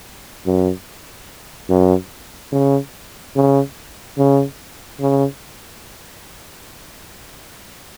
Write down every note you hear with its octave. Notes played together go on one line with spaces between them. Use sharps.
F#2
F#2
C#3
C#3
C#3
C#3